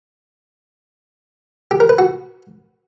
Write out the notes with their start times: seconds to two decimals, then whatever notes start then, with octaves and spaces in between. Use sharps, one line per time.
1.71 G4
1.80 A#4
1.89 B4
1.99 F#4